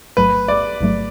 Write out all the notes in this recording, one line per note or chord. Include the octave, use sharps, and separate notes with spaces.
A1 G#2 F#3 A3 B4
D5
A1 G#2 F#3 A3